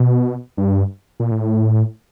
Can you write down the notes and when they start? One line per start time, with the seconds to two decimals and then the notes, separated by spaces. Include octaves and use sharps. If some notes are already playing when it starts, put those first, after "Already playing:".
Already playing: B2
0.57 G2
1.20 A#2
1.31 A2